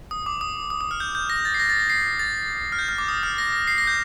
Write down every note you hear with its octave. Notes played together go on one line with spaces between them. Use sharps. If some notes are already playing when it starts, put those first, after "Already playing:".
D#6
D6
D#6
D#6
D#6
F6
G6
G6
A#6
A6
C7
A#6
A6
A#6
C7
A6
F6
G6
F6
D6
D#6
F6
A#6
A#6
C7
A#6
G6